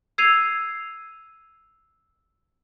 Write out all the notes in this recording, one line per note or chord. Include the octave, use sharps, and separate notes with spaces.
E6 G#6 C7 D#7 F7